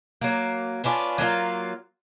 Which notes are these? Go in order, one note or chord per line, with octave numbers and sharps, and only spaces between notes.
F#3 A#3
B3 C#4 D4 F4
F#3 A#3 D#4 F4